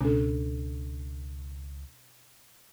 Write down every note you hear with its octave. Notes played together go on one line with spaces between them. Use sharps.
C#2 B2 C#4 D4 A4